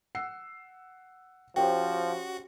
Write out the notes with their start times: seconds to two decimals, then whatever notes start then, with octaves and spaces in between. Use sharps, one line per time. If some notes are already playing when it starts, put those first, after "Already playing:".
0.15 F#5 E6 C7
1.56 F3 C#4 F#4 G4 C5 G5